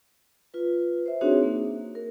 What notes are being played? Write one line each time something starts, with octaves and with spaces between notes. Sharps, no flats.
F4 B4
C5 E5
C4 D4 D#4 F#4 G#4 C#5
A#3
A#4